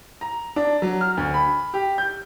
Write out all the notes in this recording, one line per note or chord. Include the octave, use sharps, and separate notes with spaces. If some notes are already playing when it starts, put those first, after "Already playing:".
A#5
D4
F#3
F6
D2
B5
G4
G6